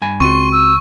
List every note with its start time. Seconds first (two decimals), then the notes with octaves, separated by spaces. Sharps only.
0.02 G2 G#5 B5
0.20 C#2 C4 F#4 C6 C#6 D#7
0.52 E6